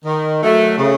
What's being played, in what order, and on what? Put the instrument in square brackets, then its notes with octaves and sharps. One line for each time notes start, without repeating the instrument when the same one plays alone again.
[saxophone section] D#3
F#3 A3
C#3